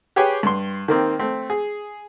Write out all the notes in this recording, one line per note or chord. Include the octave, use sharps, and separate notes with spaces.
G4 G#4 B4 C#5 G5 G#5
G2 C6
D#3 A#3 C4
A3 C4
G#4